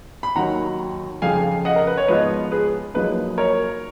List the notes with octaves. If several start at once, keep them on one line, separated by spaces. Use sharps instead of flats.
B5
D#2 D#3 F#3 F#5 A#5
F2 C#3 F3 F5 G#5
D#5 F#5
A#4
B4
C#5
G#2 F3 B3 F4 B4 D#5
G#4 B4
F#2 F3 A#3 D#4 G#4 B4
A#4 C#5